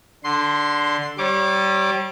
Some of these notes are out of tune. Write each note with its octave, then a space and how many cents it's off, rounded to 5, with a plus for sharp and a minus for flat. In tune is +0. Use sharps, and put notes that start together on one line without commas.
D3 +0 C6 +0
G3 -25 C#5 -35 D6 +5